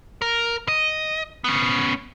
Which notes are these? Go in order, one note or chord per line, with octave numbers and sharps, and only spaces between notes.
A#4
D#5
B3 C#4